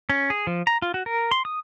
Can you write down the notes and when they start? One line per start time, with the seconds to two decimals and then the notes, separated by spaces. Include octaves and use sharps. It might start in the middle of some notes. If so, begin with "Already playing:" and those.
0.10 C#4
0.30 G#4
0.47 F3
0.67 A#5
0.82 F4
0.94 F#4
1.06 A#4
1.31 C6
1.45 D#6